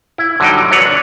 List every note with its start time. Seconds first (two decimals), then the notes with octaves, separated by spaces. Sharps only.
0.18 E4
0.40 D3 F#3 G3 D#4 G5
0.71 F#3 D4 B4 C#5 F#5
0.86 D4